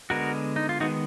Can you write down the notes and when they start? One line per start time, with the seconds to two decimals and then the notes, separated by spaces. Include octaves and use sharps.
0.10 D3 G#3 B3 F#4 A#4
0.56 D#4
0.69 F4
0.80 D#3 G#3 B3 D#4 F#4